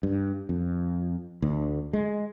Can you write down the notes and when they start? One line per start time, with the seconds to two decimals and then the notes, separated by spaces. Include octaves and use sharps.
0.03 G2
0.49 F2
1.42 D2
1.93 G#3